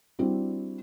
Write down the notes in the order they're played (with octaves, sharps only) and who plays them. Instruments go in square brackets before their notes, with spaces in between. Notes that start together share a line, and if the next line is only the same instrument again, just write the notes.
[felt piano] G3 C4 D4 E4 F#4